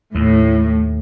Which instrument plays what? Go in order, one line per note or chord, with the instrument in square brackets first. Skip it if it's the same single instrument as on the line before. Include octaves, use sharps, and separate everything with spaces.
[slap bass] D#2 [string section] A2